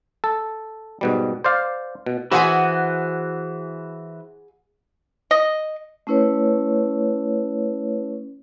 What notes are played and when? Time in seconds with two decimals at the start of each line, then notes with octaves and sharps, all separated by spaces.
0.24 A4
1.01 G#2 B2 G3
1.44 C5 D5 F5
2.06 B2
2.31 E3 F#4 G#4 C5 F#5 G#5
5.31 D#5
6.07 A3 C#4 E4 B4 C#5